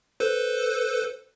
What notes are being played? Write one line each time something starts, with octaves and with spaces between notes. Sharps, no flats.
A4 B4 C5